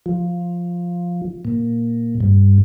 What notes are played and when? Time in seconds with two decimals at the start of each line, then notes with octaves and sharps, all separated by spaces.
0.06 F3
1.45 A#2
2.20 G2